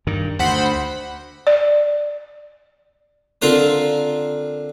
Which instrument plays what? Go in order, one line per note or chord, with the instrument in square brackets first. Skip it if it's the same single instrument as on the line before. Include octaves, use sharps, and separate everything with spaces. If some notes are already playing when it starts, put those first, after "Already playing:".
[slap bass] G2 D#3
[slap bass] D2 [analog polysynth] C5 F#5 B5
[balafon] D5
[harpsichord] D3 C4 F4 A#4 C5